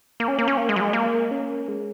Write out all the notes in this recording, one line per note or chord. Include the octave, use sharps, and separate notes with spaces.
A#3
C#4
A#3
C#4
A#3
G#3
F#3
G#3
A#3
C#4
G#3